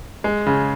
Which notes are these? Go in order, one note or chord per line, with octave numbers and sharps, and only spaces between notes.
G#3
C#3